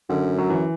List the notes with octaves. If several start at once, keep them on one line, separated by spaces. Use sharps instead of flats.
F#2 D3
F#3
E3